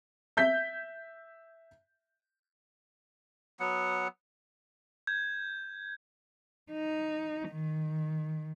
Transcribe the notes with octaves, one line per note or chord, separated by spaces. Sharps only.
E5 G6 B6
F#3 B3 F#5
G6 G#6
D#4
D#3